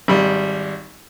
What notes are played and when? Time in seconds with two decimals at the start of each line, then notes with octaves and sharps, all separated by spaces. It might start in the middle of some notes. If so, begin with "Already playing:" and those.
0.08 G#1 G3